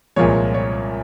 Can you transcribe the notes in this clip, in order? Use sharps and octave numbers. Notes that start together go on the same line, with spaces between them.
C2 A#2 F3 G#3 C#5
C#5